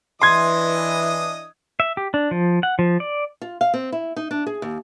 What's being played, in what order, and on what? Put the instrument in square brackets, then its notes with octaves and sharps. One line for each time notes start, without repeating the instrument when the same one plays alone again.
[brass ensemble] E3 [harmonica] D4 D#5 D#6 [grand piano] C6 G#6
[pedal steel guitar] E5
G4
D4
F3
F#5
F3
D5
[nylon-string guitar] F4
F5
C4
E4
D#4
D4
G#4
D#2